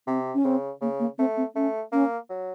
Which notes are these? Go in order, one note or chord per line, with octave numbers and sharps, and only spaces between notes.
C3 C4
C#4
C#3 C4
C#3 A#3
A#3
A3 C4
C4
A3 C#4
A#3 C#4
F#3